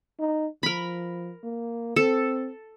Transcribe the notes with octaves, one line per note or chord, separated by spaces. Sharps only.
D#4
F3 A#4 B5
A#3
C4 A4